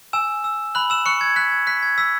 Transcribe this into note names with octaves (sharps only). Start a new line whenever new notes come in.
G#5 E6 E7
E6
B5 F#6 F#7
E6 E7
C#6 F#6 C#7
G#6
F#6 B6
G#6
F#6 B6
G#6
E6 B6